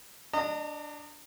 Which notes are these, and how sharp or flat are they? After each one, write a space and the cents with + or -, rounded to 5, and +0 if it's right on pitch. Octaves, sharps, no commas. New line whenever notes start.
D4 +0 D#5 -25 A#5 -40